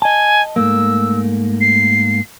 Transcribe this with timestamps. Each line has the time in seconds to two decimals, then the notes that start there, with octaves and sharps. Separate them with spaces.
0.02 D#5 G#5 A5
0.56 G#2 A3 A#3 E6
1.61 C7